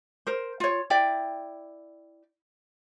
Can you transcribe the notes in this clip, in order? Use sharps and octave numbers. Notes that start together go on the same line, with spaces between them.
A#4 C5
F4 C#5
E4 D5 G5